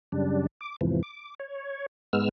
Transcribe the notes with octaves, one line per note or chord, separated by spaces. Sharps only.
F#2 C#3 G3 D4
D6
E2 G#2 C3 E3 F3
D6
C#5
G#2 G#3 B3 E6 F6